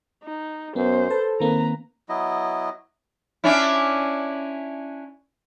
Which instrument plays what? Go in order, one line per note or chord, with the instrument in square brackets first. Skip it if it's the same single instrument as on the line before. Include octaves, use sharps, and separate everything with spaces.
[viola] D#4
[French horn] F#2 [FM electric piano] B3 [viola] C5
[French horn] A4 [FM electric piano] B4 A5
[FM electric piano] D#3 A#3 C4 [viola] B4 A#5
[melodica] F#3 B3 E4 D#5
[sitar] C#4 D4 E4